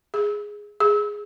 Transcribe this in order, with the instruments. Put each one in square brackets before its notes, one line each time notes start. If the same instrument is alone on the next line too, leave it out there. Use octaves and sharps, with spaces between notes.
[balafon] G#4
G#4